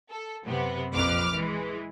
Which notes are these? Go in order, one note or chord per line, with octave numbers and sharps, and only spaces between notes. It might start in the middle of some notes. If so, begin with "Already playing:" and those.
A4
F#2 C3 B3
A#1 F2 B4 D6 F6
E3 G#3